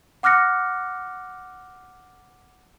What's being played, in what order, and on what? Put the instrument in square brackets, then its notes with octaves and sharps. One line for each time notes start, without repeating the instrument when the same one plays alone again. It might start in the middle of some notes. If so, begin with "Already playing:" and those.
[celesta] F#5 D6 F6 F#6 A#6 C#7